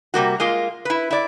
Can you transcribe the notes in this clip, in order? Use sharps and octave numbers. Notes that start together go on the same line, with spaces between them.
C3 G3 A#3 F#4
G#3 A#3 F4
E4 B4
E4 D5